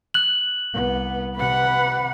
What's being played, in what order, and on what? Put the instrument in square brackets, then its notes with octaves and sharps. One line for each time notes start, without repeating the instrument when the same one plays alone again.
[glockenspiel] F#6 F#7
[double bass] C2 B3
[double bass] C3 [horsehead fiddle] B4 F#5